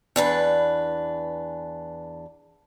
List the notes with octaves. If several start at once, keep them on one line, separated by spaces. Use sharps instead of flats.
E2 D4 B4